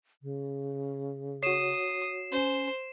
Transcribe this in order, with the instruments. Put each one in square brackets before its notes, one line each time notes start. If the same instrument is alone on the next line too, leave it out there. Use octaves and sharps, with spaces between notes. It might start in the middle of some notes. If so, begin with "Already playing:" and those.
[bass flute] C#3
[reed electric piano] F#4 C#5 [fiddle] D#6 [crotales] C7 E7
[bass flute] C#4 [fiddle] C5